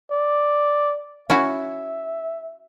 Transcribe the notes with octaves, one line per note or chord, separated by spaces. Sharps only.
D5
C#4 E4 F#4 E5